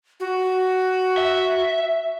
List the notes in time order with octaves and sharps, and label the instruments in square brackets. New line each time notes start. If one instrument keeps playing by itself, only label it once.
[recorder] F#4
[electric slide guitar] E5